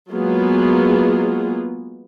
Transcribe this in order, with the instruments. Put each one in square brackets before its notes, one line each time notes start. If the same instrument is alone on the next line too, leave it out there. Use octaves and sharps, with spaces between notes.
[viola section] F#3 G#3 A#3 B3 F4 G#4